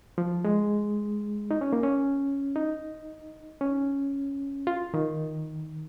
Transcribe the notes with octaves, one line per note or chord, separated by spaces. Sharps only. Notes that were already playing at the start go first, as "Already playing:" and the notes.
F3
G#3
D#4
C#4
A#3
C#4
D#4
C#4
F4
D#3